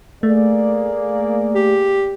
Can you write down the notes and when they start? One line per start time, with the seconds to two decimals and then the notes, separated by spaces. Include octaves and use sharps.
0.23 A3 A#3 G#4 D5
1.55 G4